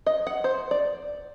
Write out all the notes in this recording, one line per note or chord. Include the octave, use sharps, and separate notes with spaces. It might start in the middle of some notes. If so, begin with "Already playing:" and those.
D#5
F#5
C5
D5